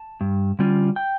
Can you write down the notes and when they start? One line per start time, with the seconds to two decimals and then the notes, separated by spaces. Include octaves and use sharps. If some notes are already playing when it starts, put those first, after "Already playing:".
Already playing: A5
0.21 G2
0.59 D3 G3 C#4 F4
0.96 G5